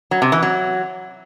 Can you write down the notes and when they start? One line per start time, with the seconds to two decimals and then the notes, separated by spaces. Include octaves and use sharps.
0.11 F#3
0.22 C3
0.32 E3
0.43 F#3